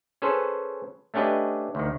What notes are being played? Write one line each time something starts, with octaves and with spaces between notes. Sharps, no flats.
C#4 G#4 A4 B4 C5
A3 C#4 D4 G4 B4 D#5
D2 D#3